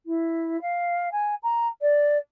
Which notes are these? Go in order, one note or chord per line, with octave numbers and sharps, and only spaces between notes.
E4
F5
G#5
A#5
D5